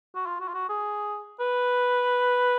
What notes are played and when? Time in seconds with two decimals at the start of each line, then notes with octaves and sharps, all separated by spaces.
0.15 F#4
0.27 F4
0.40 F#4
0.49 F4
0.54 F#4
0.69 G#4
1.40 B4